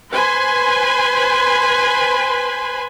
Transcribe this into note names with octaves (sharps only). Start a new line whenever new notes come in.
B4 C5 G#5 B5 C6